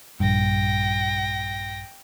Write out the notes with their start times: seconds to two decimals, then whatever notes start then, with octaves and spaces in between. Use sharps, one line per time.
0.20 A#1 G2 G5 A#6